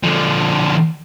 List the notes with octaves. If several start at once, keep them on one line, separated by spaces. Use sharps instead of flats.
D3 F3